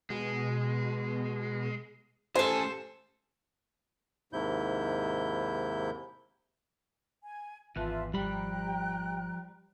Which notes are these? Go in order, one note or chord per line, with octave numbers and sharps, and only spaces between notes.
B2 G#3
A3 C#4 G4 A4 C5 G#5
D#2 G#2 C3 E4 G6
G#5
G#1 E2 F4 B4 E5 A5
F3 G3 G5 A#5 B5 F#6